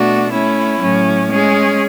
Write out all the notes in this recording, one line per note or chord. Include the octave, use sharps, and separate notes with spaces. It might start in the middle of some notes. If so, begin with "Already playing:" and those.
Already playing: B2 A3 D4 F#4
A3 C#4 E4
A2 F#3 C#4
G#3 C#4 G#4